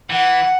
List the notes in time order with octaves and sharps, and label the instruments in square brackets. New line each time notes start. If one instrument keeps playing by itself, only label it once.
[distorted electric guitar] E3 [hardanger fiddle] F#5